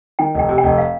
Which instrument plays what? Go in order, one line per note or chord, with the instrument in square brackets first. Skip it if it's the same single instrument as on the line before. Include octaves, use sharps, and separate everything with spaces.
[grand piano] D#3 [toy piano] G5
[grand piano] F1 [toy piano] G5
[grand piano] C3
[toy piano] G5
[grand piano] F1
[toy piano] F5